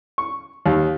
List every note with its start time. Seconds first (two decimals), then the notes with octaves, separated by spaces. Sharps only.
0.18 C#6
0.66 D#2